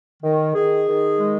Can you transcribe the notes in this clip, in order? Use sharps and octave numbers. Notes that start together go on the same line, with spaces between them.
D#3
D#3 G#4
D#3
G#3